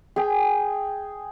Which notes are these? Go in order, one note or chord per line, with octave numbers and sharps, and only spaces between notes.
G#4 G5